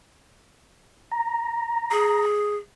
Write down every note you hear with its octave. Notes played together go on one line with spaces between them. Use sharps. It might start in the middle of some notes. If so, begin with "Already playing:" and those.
A#5
G#4